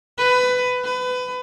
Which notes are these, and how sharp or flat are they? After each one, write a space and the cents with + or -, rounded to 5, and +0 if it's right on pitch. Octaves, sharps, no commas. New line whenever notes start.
B4 +20
B4 +25